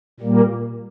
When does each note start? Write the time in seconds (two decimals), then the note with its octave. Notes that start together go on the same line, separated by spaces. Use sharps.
0.20 A#2 G3 A#3